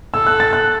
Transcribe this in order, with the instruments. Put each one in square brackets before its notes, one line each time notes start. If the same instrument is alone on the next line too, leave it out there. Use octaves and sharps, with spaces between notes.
[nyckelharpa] A4 [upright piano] E6
[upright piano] F#6
A6
F#6